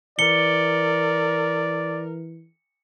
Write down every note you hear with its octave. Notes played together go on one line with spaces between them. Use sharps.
E3 A#4 D5 C#7 G7